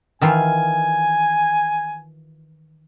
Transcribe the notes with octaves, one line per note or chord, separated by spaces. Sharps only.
D#3 E3 F4 G#5